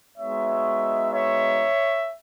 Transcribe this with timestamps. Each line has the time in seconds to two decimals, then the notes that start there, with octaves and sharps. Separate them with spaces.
0.18 G#3 B3 D#4 F#4 C#5 E5
1.12 C#5 E5